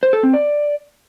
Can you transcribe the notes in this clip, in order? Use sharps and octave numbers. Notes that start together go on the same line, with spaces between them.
C5
A4
C4
D5